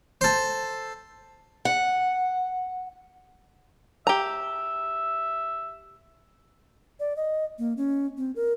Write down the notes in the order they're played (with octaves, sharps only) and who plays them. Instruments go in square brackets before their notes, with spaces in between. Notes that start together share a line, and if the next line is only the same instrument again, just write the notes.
[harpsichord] A4 C5
[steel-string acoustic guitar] F#5
[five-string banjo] G4 A#5 [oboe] E5
[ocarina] D5
D#5
A#3
C#4
C4
A#4